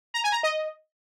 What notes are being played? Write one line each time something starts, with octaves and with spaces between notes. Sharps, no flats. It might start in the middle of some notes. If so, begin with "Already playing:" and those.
A#5
G#5
A#5
D#5